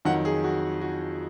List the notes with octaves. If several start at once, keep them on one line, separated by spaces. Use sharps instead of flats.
F2 D#3 F#3 F#5
G#4
F#4
F#4